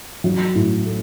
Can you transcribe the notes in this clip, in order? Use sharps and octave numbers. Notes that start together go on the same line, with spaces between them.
F#3
A2
A3